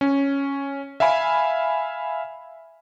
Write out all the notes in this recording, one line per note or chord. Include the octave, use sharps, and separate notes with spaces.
C#4
E5 F5 G#5 B5